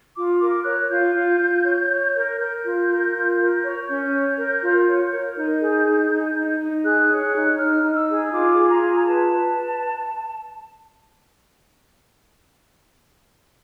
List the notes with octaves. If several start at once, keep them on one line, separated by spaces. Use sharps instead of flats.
F4 D6
A#4 D6
C#5 F#6
F4 G6
F4
F4
C#5
C#5
A#4
A#4 G6
F4
A#4
F4
A#4
C#5
C#4 G6
C#5
A#4
F4
C#5
A#4
D#4 G6
G#4
D#4
D#4
D#4
D#4
G#4 F#6
C#5
F#6
D#4
D#4 F6
D#4
E6
G#4
F4 D6
G#4
A#5
F4
A#5
B4 A5
B4